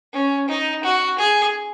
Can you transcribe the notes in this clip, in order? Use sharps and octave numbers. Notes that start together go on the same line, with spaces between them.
C#4
D#4
F#4
G#4